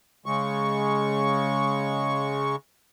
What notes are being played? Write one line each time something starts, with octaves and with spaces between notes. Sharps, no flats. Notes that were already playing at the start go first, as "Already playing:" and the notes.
C#3 G#3 C#6